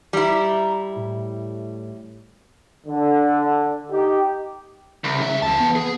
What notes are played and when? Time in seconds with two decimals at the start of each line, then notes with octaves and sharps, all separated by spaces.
0.13 G3 E4 A#5
0.96 A2
2.87 D3
3.91 D#4 G4
5.04 C2 C#3
5.21 G#2 E5
5.42 C#2 E3 A5
5.60 B3
5.76 G#4